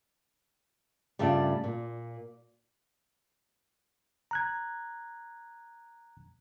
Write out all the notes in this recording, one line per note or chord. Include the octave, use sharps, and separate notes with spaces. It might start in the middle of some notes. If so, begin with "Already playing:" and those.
G2 C#3 A3 F4 A4 D5
A#2
A#5 F#6 G#6